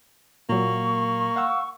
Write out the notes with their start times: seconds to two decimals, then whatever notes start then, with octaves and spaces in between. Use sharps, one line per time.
0.49 A#2 F#3 A#3 C#6
1.36 F5 F#5 E6